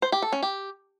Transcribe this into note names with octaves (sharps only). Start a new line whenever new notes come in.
C5
G4
A4
C#4
G4